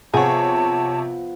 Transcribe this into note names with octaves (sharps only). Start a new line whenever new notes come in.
C3 F3 B3 G#4 C#5 F#5 A5